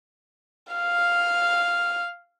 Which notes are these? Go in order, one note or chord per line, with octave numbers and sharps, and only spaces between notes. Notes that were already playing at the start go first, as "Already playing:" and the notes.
F5 F6